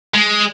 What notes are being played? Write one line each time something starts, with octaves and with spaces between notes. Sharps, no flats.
G#3